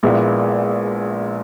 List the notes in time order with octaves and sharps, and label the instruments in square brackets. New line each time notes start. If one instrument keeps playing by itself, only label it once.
[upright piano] A#1 A#2 G#3 B3 E4